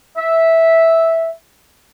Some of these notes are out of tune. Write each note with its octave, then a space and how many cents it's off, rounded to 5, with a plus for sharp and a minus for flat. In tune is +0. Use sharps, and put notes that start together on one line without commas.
E5 -10